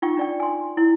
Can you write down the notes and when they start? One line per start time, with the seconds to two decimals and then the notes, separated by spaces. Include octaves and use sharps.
0.02 D#4 F4 G5 C#6
0.17 D4 D5 G5
0.40 G#5 C6
0.77 E4